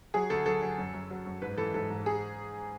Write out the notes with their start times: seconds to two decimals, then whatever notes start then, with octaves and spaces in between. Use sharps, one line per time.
0.14 F#3 G#4
0.30 D2 A4
0.46 F#3 A4
0.62 F#3
0.78 F#2
0.94 F#2
1.10 F#3
1.26 F#2
1.42 G#2 B4
1.58 E3 A4
1.74 G#2 A4
1.90 G#2
2.06 G#4